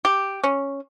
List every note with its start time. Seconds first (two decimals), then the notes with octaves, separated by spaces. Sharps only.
0.05 G4
0.44 C#4